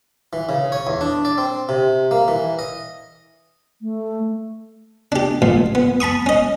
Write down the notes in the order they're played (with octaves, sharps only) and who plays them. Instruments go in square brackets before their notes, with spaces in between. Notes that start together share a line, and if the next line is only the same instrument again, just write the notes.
[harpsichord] E3
C#3
C#5
E2
D4
D5
C4
C3
A#3
E3
D#5
[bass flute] A3
[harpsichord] D4 G4
A1 A#2
B3
A5 B5 C#6 D#6
C#4 D#5